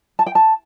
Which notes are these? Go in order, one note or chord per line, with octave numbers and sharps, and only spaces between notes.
A5
G5
A5